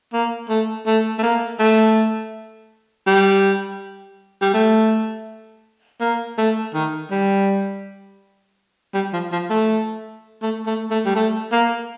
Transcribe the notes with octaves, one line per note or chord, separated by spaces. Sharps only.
A#3
A3
A3
A3
A#3
A3
G3
G3
A3
A#3
A3
D#3
G3
G3
F3
F3
A3
A3
A3
A3
G3
A3
A#3